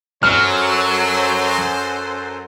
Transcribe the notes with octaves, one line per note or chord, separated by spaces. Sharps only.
F#2 F#3 A4 C5 F6